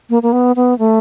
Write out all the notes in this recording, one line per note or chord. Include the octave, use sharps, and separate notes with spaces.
A#3
A#3
B3
B3
A3